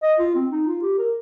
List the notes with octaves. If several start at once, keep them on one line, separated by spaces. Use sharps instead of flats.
D#5
F4
C4
D#4
F4
G4
A#4